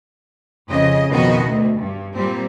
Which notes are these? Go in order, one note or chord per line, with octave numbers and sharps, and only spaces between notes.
F2 C#3 D#5
F2 B2 D#3 B3 F#4 D#5
D2
G2
A#2 G3 C4